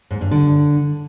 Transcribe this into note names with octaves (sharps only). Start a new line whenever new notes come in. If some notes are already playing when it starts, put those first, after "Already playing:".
G#2
G2
D3